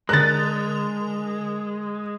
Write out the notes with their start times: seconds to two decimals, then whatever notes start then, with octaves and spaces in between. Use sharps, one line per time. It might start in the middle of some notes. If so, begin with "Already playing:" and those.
0.09 D3 G#3 A#4 F#6 A6